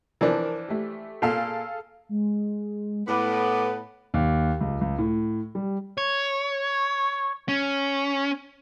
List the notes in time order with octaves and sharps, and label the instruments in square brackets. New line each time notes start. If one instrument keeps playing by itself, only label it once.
[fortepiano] E3 F3 D4 [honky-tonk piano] A#4
[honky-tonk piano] A3 G4
[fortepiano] A#2 [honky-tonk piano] G#4 A4 F5
[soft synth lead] G#3
[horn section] A2 B3 B4 [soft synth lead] D6
[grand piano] D#2
C#2
C#2
A2
G3
[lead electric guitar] C#5
C#4